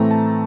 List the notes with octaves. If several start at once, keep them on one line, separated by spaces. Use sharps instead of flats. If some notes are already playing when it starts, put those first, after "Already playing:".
Already playing: A2 E3 A3 C4 A#5
A5